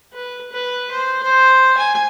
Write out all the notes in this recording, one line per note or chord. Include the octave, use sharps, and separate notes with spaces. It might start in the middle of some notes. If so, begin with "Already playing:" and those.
B4
B4
C5
C5
G#5